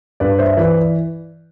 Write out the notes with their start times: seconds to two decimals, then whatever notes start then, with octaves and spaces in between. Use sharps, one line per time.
0.20 G2 B4 D5
0.39 C5 E5
0.57 E3 B4 D5